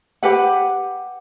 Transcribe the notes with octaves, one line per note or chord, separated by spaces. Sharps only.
G4 B4 F#5